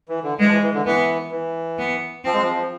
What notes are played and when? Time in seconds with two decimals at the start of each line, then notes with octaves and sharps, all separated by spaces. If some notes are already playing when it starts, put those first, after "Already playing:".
0.09 E3
0.23 D3
0.39 E3 G#3
0.46 F3
0.51 E3
0.62 E3
0.74 D3
0.86 E3 B3
1.32 E3
1.78 B3
2.24 F3 C4
2.34 G#3
2.42 F3